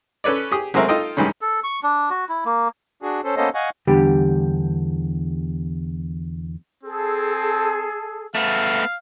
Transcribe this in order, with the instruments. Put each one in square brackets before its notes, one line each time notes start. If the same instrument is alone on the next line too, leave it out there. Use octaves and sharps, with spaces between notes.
[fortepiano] C#4 A4 B4 C#5 D5
G4 G#4 D#6
F#3 G#3 A3 C4 A#4 E5
D#4 F4 A4 D#5 G5
F#2 D#3 E3 G3 G#3 C#4
[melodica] A4
C#6
D4
F#4
E4
A#3
[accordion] D4 F#4 G#4
C#4 A4 C5
A#3 B3 C#4 A4 C5 D#5
D#5 F5 F#5 G#5 C#6
[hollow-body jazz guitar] E2 D3 G3 G4
[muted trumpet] C4 [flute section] G#4 A4
[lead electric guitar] A3 B3 [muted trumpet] F5